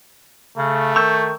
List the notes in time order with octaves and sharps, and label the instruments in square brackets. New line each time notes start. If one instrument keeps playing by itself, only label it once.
[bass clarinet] C#3 [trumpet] A3
[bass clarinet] D#3 [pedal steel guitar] C#6 E6 G6